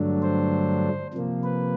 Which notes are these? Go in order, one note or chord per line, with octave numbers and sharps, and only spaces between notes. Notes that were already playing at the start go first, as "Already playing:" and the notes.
Already playing: G2 D3 F#3 A3 D4
C5
C3 F3 A#3
B4